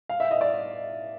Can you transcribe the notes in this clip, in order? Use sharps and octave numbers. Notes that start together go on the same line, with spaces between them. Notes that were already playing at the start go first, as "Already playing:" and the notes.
F5
E5
D#5
D5